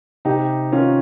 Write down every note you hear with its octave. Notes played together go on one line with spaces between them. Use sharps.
C3 D#4 G4
D#3 C#4 F4